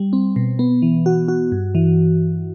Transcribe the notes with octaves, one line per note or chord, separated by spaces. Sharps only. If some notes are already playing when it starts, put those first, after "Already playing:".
Already playing: G3
C4
B2
B3
E3
F#4
F#4
G2
E3